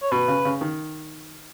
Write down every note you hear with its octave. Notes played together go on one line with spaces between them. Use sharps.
C#5
B2 B4
C#3
C#3
D#3